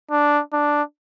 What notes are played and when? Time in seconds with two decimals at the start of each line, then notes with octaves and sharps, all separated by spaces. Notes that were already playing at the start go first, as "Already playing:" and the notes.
0.11 D4
0.53 D4